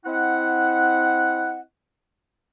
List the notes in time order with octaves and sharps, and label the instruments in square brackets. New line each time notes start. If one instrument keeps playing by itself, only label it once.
[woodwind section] C4 E4 D#5 F#5